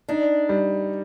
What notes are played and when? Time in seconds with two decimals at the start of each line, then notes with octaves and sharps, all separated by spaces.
0.09 D4 D#4
0.49 G3